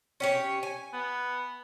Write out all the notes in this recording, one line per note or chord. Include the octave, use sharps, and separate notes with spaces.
C#4 G4 C#5
G#5
B3